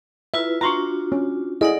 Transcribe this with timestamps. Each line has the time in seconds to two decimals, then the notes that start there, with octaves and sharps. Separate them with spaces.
0.34 E4 F4 B4 E5
0.61 D4 F4 F#4 A#5 C6 C#6
1.12 C#4
1.61 E4 G#4 A4 D5 D#5 F#5